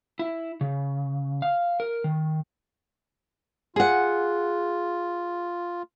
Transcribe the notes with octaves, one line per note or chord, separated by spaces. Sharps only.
E4
C#3
F5
A#4
D#3
F4 G#4 F#5